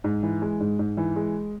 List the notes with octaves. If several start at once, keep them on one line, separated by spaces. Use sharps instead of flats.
G#2
E3
G#3
G#2
G#2
E3
G#3